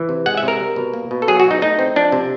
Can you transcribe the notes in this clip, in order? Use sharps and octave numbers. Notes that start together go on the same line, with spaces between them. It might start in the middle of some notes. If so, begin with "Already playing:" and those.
Already playing: E3
C3
G#3 F#5
E5
C3
A#4
G3
B2
A#3
B2
A4
F#3 G#4
F#4
B2
D#4
A3 D#4
C4
F3 D4
C3